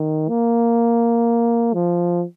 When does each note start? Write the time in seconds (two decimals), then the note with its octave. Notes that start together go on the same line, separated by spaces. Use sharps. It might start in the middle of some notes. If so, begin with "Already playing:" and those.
Already playing: D#3
0.29 A#3
1.73 F3